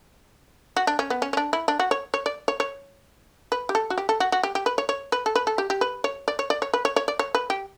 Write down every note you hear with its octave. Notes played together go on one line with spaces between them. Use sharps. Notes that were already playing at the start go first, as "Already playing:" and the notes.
F#4
D4
C#4
B3
C#4
C#4
D4
E4
D4
F#4
C#5
C#5
D5
C#5
C#5
B4
G4
A4
F#4
G4
A4
F#4
F#4
G4
G4
B4
C#5
C#5
B4
A4
B4
A4
G4
G4
B4
C#5
D5
C#5
D5
C#5
B4
C#5
C#5
D5
C#5
B4
G4